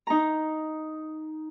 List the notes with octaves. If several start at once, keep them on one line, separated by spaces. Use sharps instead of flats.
D#4 A#5